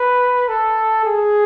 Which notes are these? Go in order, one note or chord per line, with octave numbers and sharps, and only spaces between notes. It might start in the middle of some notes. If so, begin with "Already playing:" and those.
Already playing: B4
A4
G#4